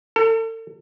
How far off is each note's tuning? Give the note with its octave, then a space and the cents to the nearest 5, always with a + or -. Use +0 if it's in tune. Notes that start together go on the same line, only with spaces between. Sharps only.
A4 +40